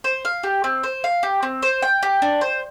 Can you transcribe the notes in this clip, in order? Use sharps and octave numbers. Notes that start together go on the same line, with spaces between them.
C5
F5
G4
C4
C5
F5
G4
C4
C5
G5
G4
D4
C5